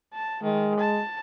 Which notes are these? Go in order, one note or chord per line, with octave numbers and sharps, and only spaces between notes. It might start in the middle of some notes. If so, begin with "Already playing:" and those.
A5
D#3 G#3
A5